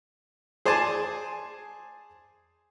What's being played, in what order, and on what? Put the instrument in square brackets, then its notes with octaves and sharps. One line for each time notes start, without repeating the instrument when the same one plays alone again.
[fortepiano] G#4 C5 D5 G#5 A5